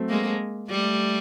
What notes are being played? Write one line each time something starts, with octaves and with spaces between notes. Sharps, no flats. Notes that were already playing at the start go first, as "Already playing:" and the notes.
Already playing: F#3 A3 C4
G#3 A#3
G3 A3